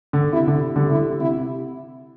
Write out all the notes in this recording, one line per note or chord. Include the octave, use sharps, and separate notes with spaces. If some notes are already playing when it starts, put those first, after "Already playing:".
D3
C3 E4
D3
D3 G3
D3 E4
C3 E4